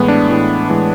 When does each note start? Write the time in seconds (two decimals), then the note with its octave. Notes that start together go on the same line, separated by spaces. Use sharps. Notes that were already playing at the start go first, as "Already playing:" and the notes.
Already playing: A2 E3 G#3 B3
0.08 D4
0.28 A2 E3 G#3
0.69 A2 E3 G#3